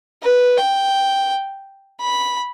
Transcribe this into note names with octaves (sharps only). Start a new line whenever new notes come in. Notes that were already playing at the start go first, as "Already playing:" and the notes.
B4
G5
B5